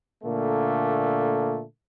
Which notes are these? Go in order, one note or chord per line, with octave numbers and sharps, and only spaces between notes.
A#2 D3 A3 A#3